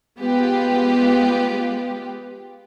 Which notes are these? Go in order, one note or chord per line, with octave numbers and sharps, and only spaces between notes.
G#3 B3 F4 G4